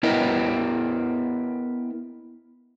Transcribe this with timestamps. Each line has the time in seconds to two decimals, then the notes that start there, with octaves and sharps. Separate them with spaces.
0.03 B3 E4 A#4 B4 D#5 G5